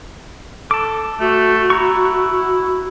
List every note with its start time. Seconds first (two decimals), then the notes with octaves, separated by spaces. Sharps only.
0.71 A4 A5 D6
1.20 A3 F#4
1.70 E4 A#5 C#6